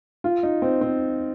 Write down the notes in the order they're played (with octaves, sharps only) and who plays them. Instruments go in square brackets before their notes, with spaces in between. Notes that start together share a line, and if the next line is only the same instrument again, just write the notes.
[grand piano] F4
D#4
C4
C4